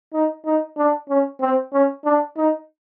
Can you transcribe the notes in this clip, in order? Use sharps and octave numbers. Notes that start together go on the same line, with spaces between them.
D#4
D#4
D4
C#4
C4
C#4
D4
D#4